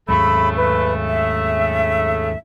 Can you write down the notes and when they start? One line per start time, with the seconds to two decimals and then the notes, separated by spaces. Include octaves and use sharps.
0.09 D#2 G#2 C#3 F#3 A3 B5
0.57 B4
1.07 E5